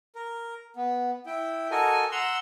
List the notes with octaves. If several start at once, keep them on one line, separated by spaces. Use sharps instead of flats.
A#4
B3
E4 G5
F#4 A4 A#4 D#5 G#5
F#5 A#5 C6 E6